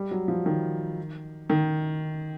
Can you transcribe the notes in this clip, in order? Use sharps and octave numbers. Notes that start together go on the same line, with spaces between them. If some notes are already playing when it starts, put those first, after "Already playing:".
Already playing: G3
F#3
F3
D#3
D#3